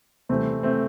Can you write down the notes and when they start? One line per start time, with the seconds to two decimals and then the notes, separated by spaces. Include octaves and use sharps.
0.29 C3 E3 G3 A3 C4
0.63 A3 C4